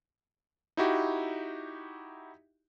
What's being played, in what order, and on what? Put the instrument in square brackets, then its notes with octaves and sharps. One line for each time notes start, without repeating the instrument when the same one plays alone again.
[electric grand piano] D#4 E4 F#4 G4